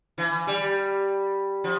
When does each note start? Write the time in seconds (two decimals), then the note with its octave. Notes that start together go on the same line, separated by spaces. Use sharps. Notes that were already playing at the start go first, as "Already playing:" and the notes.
0.18 E3
0.47 G3
1.64 F3